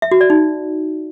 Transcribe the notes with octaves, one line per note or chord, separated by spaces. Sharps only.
E5
F#4
D5
D#4